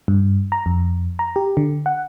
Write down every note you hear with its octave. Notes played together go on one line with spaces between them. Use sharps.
G2
A#5
F2
A#5
G4
D3
F#5